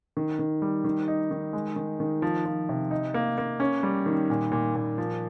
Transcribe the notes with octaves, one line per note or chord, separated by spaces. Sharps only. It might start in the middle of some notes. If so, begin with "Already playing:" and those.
D#3
D#3
G3
D#3
D#4
D#3
G#3
D#3
D#3
F3
F3
C3
D#4
A#3
A#3
C#4
G3
D#3
A#2
A#2
A#2
F3